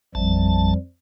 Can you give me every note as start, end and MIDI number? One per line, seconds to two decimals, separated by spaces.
0.15 0.74 33
0.15 0.76 41
0.15 0.76 53
0.15 0.76 55
0.15 0.74 81